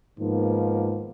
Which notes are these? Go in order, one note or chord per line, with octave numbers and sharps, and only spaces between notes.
G#2 D#3 F3 A#3 B3